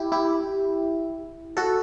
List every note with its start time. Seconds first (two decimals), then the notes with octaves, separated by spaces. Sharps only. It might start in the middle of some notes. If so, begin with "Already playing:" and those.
Already playing: E4 G4
0.12 E4 G4
1.57 F#4 A4